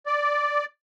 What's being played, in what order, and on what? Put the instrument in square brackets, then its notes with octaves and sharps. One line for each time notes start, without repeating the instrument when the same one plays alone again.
[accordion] D5